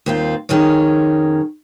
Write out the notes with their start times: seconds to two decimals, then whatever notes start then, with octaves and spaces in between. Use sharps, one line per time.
0.06 D#2 C4 F4
0.49 F2 D#3 C#4 G#4 C#5